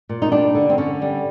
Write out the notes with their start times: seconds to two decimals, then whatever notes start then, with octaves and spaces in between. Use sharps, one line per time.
0.09 A#2
0.22 D#4
0.32 G3 D4
0.55 D3
0.70 C4
0.78 D3 C#4
1.02 G3